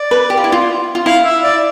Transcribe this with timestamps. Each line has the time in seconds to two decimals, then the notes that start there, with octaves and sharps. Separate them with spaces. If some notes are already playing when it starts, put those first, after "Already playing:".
Already playing: D5
0.11 B4
0.30 G4
0.37 F4
0.44 E4
0.52 F4
0.95 F4
1.05 E4 F5
1.24 E5
1.43 D5